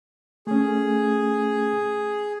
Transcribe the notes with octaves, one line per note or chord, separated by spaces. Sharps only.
A3 C#4 G#4